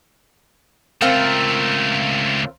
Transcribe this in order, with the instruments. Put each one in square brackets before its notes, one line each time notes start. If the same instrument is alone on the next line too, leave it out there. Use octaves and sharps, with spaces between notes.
[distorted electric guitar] C#2 A3 [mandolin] C4 F4 A#4